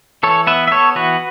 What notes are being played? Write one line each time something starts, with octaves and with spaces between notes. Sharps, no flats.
E3 A4 C#5
B3 B4 E5
E5
B3 A4 C#5
E3 F#4 B4